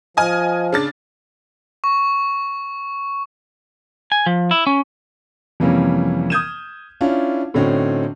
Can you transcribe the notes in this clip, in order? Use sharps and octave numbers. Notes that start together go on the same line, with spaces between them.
F3 D#5 G#5 F6
C#3 D4 A6
C#6
G#5
F3
E4
C#4
F2 C3 E3 G3 A#3 C#4
D#6 F6 G6 G#6 D#7 E7
C#4 D4 E4 F4
A2 D3 C4 C#4 D#4 F#4